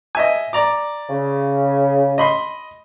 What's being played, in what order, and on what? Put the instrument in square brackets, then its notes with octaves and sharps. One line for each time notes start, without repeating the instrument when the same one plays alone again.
[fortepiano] D#5 E5 G#5
D5 A#5 D6
[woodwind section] C#3
[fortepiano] D#5 B5 C6